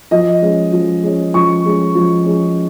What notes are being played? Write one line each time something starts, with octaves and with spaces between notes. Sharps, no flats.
F3 D#5
G#3 C#4
F3
G#3 C#4
F3 C#6
G#3 C#4
F3
G#3 C#4